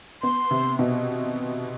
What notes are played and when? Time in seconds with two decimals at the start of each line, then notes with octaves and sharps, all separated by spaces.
0.22 B3 C6
0.51 C3
0.79 B2